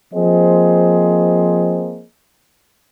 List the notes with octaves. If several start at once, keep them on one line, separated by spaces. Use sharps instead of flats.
F3 A#3 C4 G#4 C5 D#5